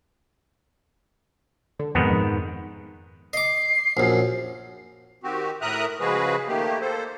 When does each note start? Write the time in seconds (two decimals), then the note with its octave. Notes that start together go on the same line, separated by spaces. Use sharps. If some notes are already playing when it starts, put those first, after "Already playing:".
1.79 D3
1.95 F2 G#2 C3 D#3 B3
2.10 F2
3.33 D#5 D6 C7
3.97 A#1 F#2
5.23 D#3 C4 F#4 G4
5.61 A2 A#4 E5 A#5 D#6 F#6
6.00 C#3 F3 G#3 F#4 G#4 B4
6.48 D#3 A3 A#3 G4
6.81 A#3 A4 C5